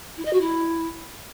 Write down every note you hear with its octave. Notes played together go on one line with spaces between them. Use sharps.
E4
D#5
F#4
E4